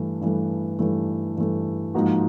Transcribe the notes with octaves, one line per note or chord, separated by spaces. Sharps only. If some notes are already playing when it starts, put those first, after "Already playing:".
Already playing: G2 E3 A3
G2 E3 A3
G2 E3 A3
G2 E3 A3
G#2 F3 A#3 D#4 F#4